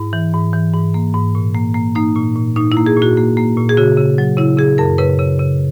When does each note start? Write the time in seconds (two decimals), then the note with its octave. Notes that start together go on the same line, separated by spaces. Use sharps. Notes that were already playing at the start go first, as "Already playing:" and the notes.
Already playing: G#2 E4
0.13 E3
0.33 G#2
0.53 E3
0.73 G#2
0.94 A#3
1.14 G#2
1.35 A#2
1.54 A#3
1.74 A#3
1.95 A#3 D#4
2.15 A#2
2.36 A#2
2.56 A#2 D#4
2.72 E4
2.77 A#3
2.86 G#4
2.97 A#2
3.02 F#4
3.17 A#3
3.37 A#3
3.57 A#2
3.69 G#4
3.77 C#3 F#4
3.97 C#3
4.18 F#3
4.37 C#3 E4
4.58 C#3 G#4
4.78 F#2 A#4
4.98 C#3 B4
5.19 C#3
5.39 C#3